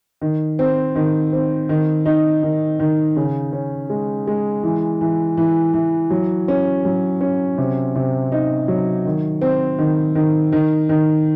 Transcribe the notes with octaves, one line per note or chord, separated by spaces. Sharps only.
D#3
C4
D#3
C4
D#3
D#4
D#3
D#3
C#3
C#4
G#3
G#3
E3
E3
E3
E3
F#3
C#4
F#3
C#4
C3
C3
D#4
F#3
D#3
C4
D#3
D#3
D#3
D#3